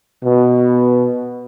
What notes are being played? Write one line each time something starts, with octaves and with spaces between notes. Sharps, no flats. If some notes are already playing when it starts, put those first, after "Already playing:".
B2